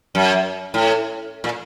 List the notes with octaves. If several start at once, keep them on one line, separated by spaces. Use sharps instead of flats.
F#2
A2
A#2